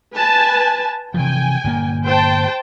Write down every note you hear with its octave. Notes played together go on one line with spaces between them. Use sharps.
B4 G#5 A5
C3 E3 F3 G5 G#5
G1 A#2 A#3
C5 G5 A5